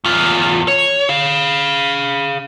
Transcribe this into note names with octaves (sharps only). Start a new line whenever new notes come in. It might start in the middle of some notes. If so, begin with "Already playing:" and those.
E2 F4
C#5
G#4 F5